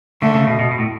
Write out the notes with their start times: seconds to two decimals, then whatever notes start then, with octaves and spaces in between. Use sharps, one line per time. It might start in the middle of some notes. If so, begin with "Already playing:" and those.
0.22 D3 A3
0.35 C#3
0.47 B2
0.59 B2
0.71 B2
0.78 A2